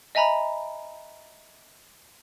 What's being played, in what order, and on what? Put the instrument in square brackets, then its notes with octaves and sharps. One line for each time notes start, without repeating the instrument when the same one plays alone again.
[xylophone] D#5 E5 G#5 A#5 B5